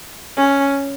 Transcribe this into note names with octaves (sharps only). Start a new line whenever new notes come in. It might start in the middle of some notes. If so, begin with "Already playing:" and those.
C#4